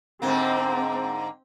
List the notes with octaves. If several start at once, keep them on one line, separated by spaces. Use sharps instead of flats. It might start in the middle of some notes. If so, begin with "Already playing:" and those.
G#2 D3 A#3 C4